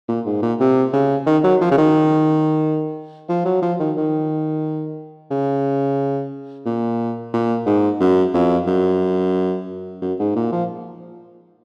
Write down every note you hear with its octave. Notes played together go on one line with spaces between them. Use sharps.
A#2
G#2
A#2
C3
C#3
D#3
F#3
F3
C#3
D#3
F3
F#3
F3
D#3
D#3
C#3
A#2
A#2
G#2
F#2
F2
F#2
F#2
G#2
A#2
F3